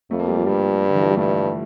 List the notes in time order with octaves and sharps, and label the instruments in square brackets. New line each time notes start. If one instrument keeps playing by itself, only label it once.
[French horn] F2 [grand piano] A3
[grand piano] A#3
G3
F3
[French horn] G2 [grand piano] G3
[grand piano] D3
E3
F3
G3
[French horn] G2 [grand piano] A3